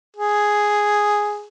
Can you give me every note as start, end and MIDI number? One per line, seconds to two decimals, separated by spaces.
0.17 1.46 68